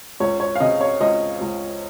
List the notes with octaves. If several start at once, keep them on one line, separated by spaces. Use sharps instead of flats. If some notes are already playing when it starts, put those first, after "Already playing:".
C#2 C#5
C#5
F5
C#3 D#5
C#5
C#2 D#5
C#2